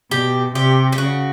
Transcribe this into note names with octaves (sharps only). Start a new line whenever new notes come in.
B2 G4
C3 G4
G4
C#3 F#4